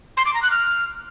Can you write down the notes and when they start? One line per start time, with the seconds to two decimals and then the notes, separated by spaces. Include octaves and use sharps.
0.17 C6
0.26 D6
0.34 A#5
0.43 F#6
0.51 F6